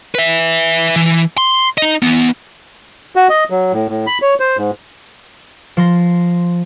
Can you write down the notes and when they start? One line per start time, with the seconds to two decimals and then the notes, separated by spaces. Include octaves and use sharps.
0.15 B4 E5
0.96 E3
1.38 C6
1.78 D#4 D#5
2.02 E3 B3
3.16 F#4
3.29 D#5
3.50 F#3
3.73 A2
3.89 A2
4.07 B5
4.22 C#5
4.40 C5
4.57 G#2
5.77 F3 C6 A#6